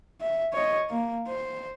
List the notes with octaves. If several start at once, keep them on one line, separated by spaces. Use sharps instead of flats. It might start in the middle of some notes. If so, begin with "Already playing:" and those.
E5
C#5 D#5
A#3
C5